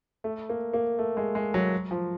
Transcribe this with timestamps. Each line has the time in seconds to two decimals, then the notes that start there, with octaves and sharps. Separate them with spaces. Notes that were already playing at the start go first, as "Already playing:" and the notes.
0.24 A3
0.49 A#3
0.73 A#3
0.99 A3
1.17 G#3
1.35 G#3
1.54 F#3
1.91 F3